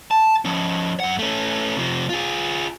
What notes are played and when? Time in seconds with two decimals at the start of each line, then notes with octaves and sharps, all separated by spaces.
0.11 A5
0.45 F3 C#4
1.00 F#2 F#5
1.19 A3 C#4
1.77 C3 F3
2.09 F4 G#4